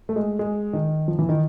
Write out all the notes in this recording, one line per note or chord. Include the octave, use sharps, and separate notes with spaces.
A3
G#3
G#3
D#3
F3
E3
D#3